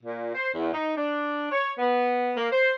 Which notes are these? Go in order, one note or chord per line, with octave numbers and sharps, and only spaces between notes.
A#2
C5
E2
D#4
D4
C#5
B3
A#3
C5